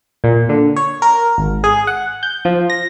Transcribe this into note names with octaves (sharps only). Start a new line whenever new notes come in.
A#2
D3
C#5
A#4
G#1
G#4
F#5
G6
F3
A#6